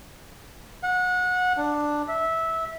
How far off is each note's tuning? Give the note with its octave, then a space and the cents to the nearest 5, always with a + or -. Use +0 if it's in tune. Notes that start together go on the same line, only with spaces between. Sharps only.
F#5 -25
D4 +5
E5 -15